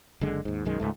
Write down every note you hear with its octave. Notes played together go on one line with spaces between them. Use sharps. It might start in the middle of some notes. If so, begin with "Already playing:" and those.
F#1 D3 G#3
D#2 G#2
B1 F#2 D#3 G#3
C#2 G#2 A3